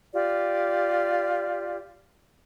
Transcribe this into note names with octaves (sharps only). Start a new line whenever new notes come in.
F4 G4 D5